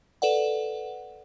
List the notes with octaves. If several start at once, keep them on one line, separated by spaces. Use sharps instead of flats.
A4 B4 D5 F#5